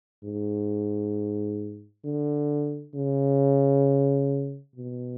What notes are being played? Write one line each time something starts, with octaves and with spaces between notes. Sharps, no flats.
G#2
D3
C#3
B2